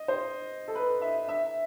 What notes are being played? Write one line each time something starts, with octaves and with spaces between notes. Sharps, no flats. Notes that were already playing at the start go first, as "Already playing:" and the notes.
Already playing: D#5
C5
A4
B4
E5
E5